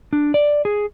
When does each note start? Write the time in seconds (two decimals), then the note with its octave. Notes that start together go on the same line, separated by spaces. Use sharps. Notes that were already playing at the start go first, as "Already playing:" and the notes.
0.13 D4
0.34 D5
0.65 G#4